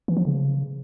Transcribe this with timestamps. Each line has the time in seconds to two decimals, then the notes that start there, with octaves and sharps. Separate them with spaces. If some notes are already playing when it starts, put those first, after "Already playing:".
0.08 E3
0.17 F3
0.25 C#3